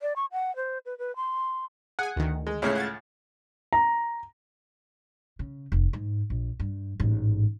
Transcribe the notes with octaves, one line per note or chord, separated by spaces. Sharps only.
D5
C#6
F#5
C5
B4
B4
C6
G#4 F#5 G#5
D2 D#3
G#3
C#2 A2 C#3 C#5 E5 C7
F#5 G#6 A6
A#5
C#3
F1
G#2
A#1
G2
A1 G#2